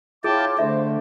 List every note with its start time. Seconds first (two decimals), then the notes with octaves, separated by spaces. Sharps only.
0.24 E4 F4 G#4 C#5 G5 A5 D6
0.59 D3 A3 C5 E5